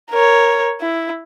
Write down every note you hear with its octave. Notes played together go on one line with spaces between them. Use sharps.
A#4 C#5
E4